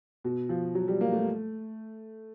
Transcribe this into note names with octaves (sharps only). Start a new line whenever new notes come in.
B2
F3
F#3
G3
A#3
A3